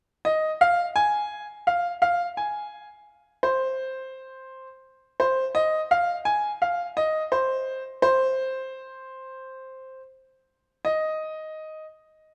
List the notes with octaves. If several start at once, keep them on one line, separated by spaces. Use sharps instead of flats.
D#5
F5
G#5
F5
F5
G#5
C5
C5
D#5
F5
G#5
F5
D#5
C5
C5
D#5